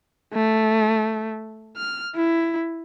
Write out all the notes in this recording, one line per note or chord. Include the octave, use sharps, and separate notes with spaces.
A3
F6
E4